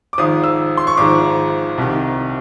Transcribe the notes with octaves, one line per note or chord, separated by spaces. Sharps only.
D6
G#1 G#2 F3 D#6
E6
C6
C#6
G#1 G#2 F3 D6
C2 C3 D#3